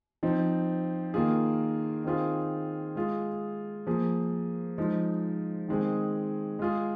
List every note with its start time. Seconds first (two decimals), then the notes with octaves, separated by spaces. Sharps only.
0.23 F3 C4 D#4
1.14 D#3 A#3 F4 G#4
2.04 D#3 C4 F4 G#4
2.95 G#3 F4 G#4
3.87 F3 A#3 G#4
4.78 F3 G#3 D#4
5.68 D#3 G#3 C4 G#4
6.59 G#3 F4 G#4